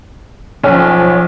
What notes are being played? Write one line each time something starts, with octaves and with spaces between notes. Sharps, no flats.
B1 F3 C#4